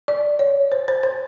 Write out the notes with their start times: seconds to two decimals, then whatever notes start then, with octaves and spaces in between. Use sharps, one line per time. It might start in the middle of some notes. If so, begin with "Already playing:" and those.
0.08 D5
0.39 C#5
0.72 C5
0.88 C5
1.03 C5